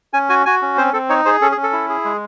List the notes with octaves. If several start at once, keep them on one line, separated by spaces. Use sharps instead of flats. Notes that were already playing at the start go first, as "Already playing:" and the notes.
C#4 G#5
F#4 G#5
F#4 G#5
C#4
C4 C5
C4 A4
D#4 C#5
G#4 C5
C#4 A4
G#4
C#4
A4
E4
G#4
G#3